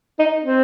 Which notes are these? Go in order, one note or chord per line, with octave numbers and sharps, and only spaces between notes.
D#4
C4